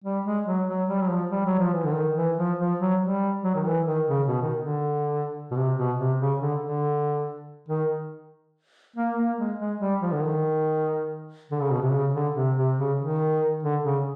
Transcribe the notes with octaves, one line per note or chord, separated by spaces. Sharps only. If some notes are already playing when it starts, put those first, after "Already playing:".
G3
G#3
F#3
F#3
G3
F#3
F3
G3
F#3
F3
E3
D3
D#3
E3
F3
F3
F#3
G3
F#3
D#3
E3
D#3
C#3
B2
D#3
D3
B2
C3
B2
C3
C#3
D3
D3
D#3
A#3
A#3
G#3
G#3
G3
F3
D3
D#3
D3
C#3
B2
C3
C#3
D3
C3
C3
C#3
D#3
D3
C#3